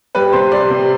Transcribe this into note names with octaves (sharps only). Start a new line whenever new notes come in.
G3 B4
C3 C5
G3 D5
C3